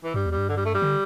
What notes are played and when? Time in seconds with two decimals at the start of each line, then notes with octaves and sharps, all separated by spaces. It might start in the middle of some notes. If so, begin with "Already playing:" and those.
0.04 E3
0.14 G2 G3
0.26 E2
0.31 G3
0.38 G2
0.49 D3
0.57 G3
0.65 A3
0.74 G3
0.82 D3